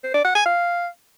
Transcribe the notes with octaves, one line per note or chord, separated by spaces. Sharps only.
C5
D5
F#5
G#5
F5